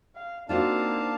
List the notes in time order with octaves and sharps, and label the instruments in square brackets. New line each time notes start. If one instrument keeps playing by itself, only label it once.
[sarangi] F5
[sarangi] A#3 [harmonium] C4 [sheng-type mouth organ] D4 F5 A5 [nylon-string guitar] D#4 F4 F#4